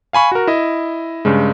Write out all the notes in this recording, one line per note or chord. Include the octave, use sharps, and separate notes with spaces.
F5 G#5 B5 C#6
F#4 A#4
E4 D#5
G2 C#3 G#3